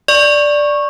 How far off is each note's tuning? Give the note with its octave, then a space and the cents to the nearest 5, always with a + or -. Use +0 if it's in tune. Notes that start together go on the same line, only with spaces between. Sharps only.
D5 +0 C#6 -10